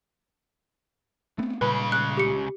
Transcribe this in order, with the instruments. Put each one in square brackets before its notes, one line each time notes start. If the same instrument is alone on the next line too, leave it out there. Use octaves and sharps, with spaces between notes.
[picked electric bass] A3 B3 C4
[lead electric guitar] C#2 C#3 [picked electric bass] A#2 G3 [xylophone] B4 B5
[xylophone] F#6
G4 C#7